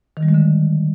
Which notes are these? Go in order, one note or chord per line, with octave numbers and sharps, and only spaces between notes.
D#3
G3
G#3
D3